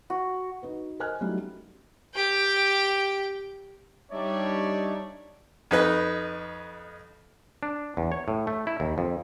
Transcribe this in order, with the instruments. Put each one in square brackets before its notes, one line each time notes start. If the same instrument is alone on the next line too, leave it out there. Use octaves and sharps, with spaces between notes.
[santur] F#4
[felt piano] D#4 F#4 B4
A#4 C5 D#5 G#5 F6 F#6
F#3 G3 A3 C#4 D#4 E4
[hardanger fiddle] G4 G5
[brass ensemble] G3 C#5 D5 [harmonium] D4 D#4 E5
[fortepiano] F2 D#4 B4
[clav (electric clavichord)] D4
E2
C#5
A2
A3
E4
D#2
F2